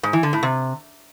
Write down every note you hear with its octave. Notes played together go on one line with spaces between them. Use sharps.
G#2
E3
D3
A2
C3